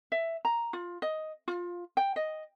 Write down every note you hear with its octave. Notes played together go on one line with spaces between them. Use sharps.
E5
A#5
F4
D#5
F4
G5
D#5